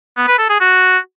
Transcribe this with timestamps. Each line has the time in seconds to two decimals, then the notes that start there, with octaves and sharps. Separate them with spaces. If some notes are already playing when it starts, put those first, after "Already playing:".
0.17 B3
0.27 B4
0.38 A4
0.49 G#4
0.60 F#4